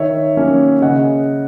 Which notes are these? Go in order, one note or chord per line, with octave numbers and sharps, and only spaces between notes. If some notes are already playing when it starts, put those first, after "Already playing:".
Already playing: D#3 C#5 E5
F#3 A#3 C#4
C#3 D#5 F#5